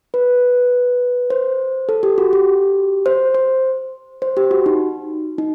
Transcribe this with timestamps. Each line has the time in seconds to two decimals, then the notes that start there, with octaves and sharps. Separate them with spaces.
0.14 B4
1.30 C5
1.89 A4
2.03 G4
2.18 F#4
2.33 G4
3.06 C5
3.35 C5
4.22 C5
4.37 G4
4.51 F#4
4.66 D#4
5.38 D#4